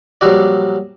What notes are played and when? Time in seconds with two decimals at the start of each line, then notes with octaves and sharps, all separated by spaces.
0.21 A#1 F#3 G3 F#4 D5